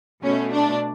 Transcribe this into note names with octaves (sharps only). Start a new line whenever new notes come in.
B2 A3 C#4
D4